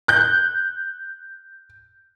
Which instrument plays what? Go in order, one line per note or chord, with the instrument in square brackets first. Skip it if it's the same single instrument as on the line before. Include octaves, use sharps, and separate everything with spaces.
[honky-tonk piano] F#6 G6